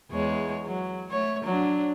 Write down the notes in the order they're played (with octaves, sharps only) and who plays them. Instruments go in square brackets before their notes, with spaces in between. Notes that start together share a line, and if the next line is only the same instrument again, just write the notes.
[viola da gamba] E2 G#3 C#5
F#3
A3 C#5
F#3 D4